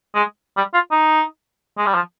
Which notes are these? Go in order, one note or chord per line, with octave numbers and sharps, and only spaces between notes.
G#3
G3
F4
D#4
G#3
G3
F3